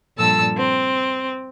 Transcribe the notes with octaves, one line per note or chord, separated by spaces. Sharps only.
G2 A#2 F3 A4 A5 E6
C4